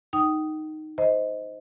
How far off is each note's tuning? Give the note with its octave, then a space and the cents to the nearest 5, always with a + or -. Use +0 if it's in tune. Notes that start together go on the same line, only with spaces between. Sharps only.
D#4 +0 G5 -30 D#6 +0
C5 -10 D#5 +15